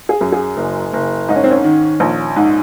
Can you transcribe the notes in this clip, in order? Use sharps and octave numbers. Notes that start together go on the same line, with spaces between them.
G#4
F#2
G#4
F#1
F#1
G#2 D#4
C#4
C4
C#4
D#3
A#1
G#2